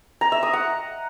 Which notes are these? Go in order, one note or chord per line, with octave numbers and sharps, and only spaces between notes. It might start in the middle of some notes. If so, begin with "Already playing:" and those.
A#5
E5
D#6
F#5